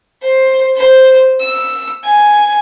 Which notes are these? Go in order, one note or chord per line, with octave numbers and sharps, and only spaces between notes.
C5
C5
E6
G#5